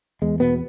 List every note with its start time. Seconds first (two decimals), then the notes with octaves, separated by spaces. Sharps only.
0.22 E2 G#3
0.40 B2 B3